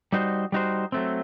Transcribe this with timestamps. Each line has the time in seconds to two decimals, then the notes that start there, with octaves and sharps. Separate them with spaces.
0.12 G3 D#4 F#4 C5
0.52 G3 D#4 F#4 C5
0.92 F#3 A3 C4